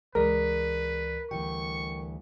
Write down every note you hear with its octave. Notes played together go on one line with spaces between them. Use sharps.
C#2 E3 G#3 A#4 B4 D5
D2 E3 G3 G5 C#6